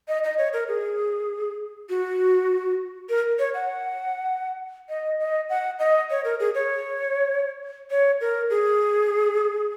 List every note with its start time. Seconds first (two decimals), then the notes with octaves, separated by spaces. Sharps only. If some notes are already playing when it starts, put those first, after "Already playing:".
0.08 D#5
0.24 D#5
0.38 C#5
0.53 A#4
0.68 G#4
1.89 F#4
3.09 A#4
3.39 C#5
3.54 F#5
4.89 D#5
5.20 D#5
5.50 F#5
5.79 D#5
6.10 C#5
6.25 A#4
6.40 G#4
6.55 C#5
7.90 C#5
8.21 A#4
8.50 G#4